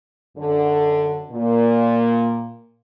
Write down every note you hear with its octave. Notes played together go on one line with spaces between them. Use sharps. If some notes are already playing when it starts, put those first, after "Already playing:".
F#2 D3
A#2